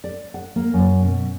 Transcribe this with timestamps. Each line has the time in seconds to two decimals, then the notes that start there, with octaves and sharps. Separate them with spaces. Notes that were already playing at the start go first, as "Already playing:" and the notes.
0.04 D5
0.34 F#5
0.56 A#3
0.74 F#2
1.02 B2